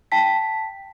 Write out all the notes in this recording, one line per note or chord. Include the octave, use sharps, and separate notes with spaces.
G5 A5 B6